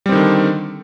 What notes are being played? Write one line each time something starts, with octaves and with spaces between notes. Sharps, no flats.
D3 D#3 G3 C4